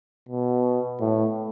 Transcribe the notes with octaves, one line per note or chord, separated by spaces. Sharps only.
B2
A2